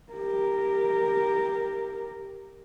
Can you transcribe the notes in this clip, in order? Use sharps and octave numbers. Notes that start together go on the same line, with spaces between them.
G4 A#4